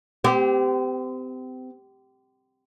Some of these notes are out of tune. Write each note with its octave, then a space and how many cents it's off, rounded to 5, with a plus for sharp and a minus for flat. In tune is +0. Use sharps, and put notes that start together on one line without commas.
C4 -35 G4 +0